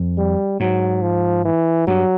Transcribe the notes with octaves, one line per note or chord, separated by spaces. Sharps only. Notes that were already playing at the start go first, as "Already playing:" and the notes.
Already playing: F2
G3
G#2 F#3
F3
E3
G2 F#3